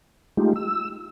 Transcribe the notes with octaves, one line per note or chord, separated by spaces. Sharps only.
G#3 A3 D#4 F4 G4
E6